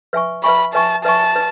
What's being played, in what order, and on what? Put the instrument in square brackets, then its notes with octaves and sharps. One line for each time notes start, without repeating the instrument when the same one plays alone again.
[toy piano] B4 E5 G#5 C#6
[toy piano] B4 E5 G#5 C#6 [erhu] B5
[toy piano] B4 E5 G#5 C#6 [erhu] A5
[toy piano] B4 E5 G#5 C#6 [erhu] A5
[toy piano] B4